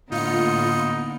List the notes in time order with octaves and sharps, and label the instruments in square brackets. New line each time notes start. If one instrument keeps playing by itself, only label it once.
[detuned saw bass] A2 [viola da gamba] D3 A#3 B3 [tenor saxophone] D#4 [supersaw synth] F4 C#7